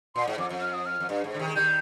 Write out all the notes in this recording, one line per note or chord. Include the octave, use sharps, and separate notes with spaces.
A#2 C6
G#2
F2 D6
F2
F6
D#6
F6
F2
G2
G#2
D3
C3 D#3
G#3
D#3 G3 G6